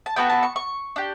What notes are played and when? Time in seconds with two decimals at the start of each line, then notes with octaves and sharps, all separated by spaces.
0.06 A5
0.16 B3 F#4 A4 G5
0.30 A5
0.43 C#6
0.56 C#6
0.96 D4 G4